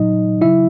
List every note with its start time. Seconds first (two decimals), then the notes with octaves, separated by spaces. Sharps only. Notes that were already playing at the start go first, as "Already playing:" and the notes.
Already playing: A#2 F#3 D#4 D#5
0.41 C#3 F#3 E4 E5